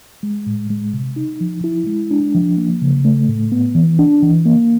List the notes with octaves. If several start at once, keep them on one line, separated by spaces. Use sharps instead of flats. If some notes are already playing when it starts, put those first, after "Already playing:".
G#3
A2
G#3
C3
D#4
F3
E4
G#3
D4
F3
A#3
C#3
A3
A2
B3
E3
D4
E3
A#3